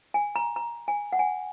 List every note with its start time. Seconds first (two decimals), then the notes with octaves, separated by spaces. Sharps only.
0.14 G#5
0.36 A#5
0.56 A#5
0.88 G#5
1.13 F#5
1.19 G#5